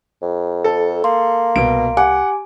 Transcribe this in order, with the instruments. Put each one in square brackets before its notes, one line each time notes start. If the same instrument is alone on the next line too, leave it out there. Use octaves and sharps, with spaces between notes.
[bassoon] F2
[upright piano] A4
[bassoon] A#3 [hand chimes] C6
[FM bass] C2 [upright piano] B2 D7
[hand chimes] G4 G#5 D6 [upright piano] F#5